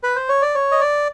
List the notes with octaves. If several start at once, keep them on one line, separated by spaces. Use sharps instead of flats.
B4
C5
C#5
D5
C#5
D#5
D5